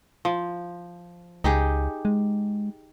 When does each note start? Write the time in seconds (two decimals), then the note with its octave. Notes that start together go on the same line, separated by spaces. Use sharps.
0.25 F3
1.44 C#2 D#4 G4 G#4
2.05 G#3